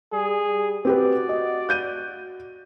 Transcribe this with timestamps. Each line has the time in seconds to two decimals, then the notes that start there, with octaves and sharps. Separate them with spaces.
0.12 G3 G#4
0.46 G3
0.85 C4 F#4 G4 B4 D5
1.29 D#5
1.69 F#6 G6 D#7